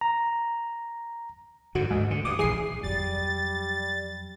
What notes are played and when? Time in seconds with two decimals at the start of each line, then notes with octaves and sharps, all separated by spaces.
0.01 A#5
1.75 G#2 D3 F#4
1.90 D2 G#2
2.11 D3
2.25 G2 D6 D#6
2.39 A#1 E3 G#4 D#6 C7
2.83 F2 F#3 G3 A6